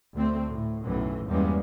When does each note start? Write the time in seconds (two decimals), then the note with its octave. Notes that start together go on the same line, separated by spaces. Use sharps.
0.14 D2 A3 C4
0.51 A2
0.84 B1 F#2 A2 E3
1.28 E2 G2 G3 G#3 A#3 C#4